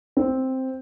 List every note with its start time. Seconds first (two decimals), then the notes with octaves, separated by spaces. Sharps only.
0.17 C4